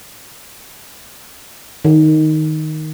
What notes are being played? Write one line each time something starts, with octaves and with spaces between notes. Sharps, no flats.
D#3